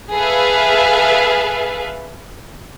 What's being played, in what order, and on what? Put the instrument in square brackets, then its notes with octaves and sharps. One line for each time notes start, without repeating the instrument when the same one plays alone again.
[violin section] G#4 A4 B4 E5 F5